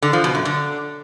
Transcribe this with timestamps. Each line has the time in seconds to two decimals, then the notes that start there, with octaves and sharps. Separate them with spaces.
0.02 D3
0.13 F3
0.24 B2
0.35 F#2
0.45 D3